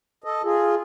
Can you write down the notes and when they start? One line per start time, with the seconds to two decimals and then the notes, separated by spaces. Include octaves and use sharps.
0.24 A4 D#5
0.43 F4 G#4